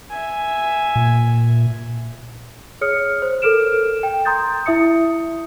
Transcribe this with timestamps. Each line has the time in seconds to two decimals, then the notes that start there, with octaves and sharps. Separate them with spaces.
0.11 E5 G#5
0.96 A#2
2.81 G#4 C#5 D#6 F6 C#7
3.22 C5
3.42 A4 A#4 F6 D7 E7
4.03 G5
4.25 A#5 C6 D#6 G6 A6
4.66 E4 E5 D#6 C#7